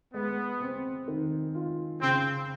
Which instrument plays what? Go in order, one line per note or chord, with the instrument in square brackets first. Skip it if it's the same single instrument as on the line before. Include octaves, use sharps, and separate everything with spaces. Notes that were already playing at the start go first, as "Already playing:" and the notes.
[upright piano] G#3 [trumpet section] B3
[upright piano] C4
D#3
F4
[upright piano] C#3 [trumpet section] C4